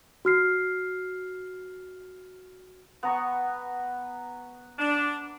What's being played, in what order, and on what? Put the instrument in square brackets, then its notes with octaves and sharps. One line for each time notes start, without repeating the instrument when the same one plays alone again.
[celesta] F#4 F6 C7
[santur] B3 A#5 C#6
[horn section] D4